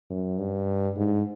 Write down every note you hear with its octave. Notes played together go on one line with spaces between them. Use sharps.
F#2
G2
G#2